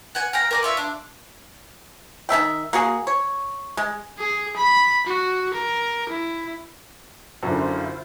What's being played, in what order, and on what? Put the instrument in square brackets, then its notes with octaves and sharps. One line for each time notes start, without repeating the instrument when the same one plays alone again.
[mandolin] F#5 G#5
F5 G5 A#5
A#4 D5 G#5
F4 C#5 E5
D4
[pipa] D#3 C#4 E5 G5
A#3 F#4 G#4
C#5
G#3
[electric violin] G#4
B5
F#4
A#4
E4
[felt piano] F#2 D3 [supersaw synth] E4 F4 C5